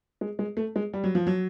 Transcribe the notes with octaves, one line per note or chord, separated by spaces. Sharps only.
G#3
G#3
A3
G#3
G3
F#3
F3
F#3